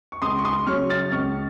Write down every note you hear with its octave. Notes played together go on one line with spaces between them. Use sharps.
C#6
C#2 C6 D#6
C#6
C6 D#6
C#3 F#3 C#6 F6
F6 A6
C#2 C#6 F6